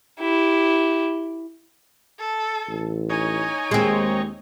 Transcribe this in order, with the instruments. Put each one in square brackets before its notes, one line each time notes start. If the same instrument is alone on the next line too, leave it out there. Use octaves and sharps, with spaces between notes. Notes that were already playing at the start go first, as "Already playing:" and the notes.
[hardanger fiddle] E4 G4
[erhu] A4
[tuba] A1
[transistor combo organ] D#4 C#5 [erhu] G#5
[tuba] D#2 [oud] G#3 C4